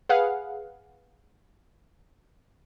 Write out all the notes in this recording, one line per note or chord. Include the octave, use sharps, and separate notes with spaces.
G#4 B4 F5 F#5